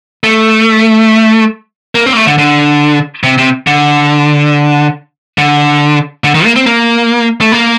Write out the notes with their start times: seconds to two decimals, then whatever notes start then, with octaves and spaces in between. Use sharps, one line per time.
0.24 A3
1.95 A#3
2.06 C4
2.13 A#3
2.17 A3
2.27 D3
2.38 D3
3.23 C3
3.38 C3
3.67 D3
5.38 D3
6.24 D3
6.34 D#3
6.45 A#3
6.56 C4
6.66 A#3
7.41 A3
7.52 A#3